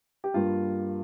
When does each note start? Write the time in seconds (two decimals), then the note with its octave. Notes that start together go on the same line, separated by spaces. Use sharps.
0.24 G4
0.34 G2 G3 A#3 F4